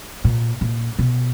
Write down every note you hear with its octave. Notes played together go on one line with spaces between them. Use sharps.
A#2
A#2
B2